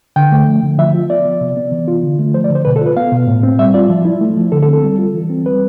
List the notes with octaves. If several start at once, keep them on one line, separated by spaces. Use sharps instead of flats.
D3 G5
A3
F3
D3
F3 E5
F4
B3 D5
F3
C3
B3
E3
F4
D3
A3
F3 C5
D5
D3
C5
B2 B4
A4
F4
B4
B3 F5
B2
A2
C4
G3 E5
F4 D5
F3
E4
A3
F3
D3 A4
A4
C4
A4
G3
F4
E3
C4
G3 B4